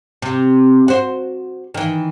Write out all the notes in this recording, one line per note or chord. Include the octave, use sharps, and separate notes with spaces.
C3
F#4 C5
D#3 E3